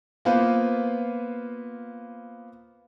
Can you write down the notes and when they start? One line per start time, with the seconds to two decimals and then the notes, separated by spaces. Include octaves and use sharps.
0.25 A#3 B3 F4 B4 C5